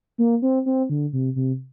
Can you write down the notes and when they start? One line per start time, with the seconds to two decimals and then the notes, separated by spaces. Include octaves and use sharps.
0.18 A#3
0.42 C4
0.66 C4
0.90 D3
1.13 C3
1.36 C3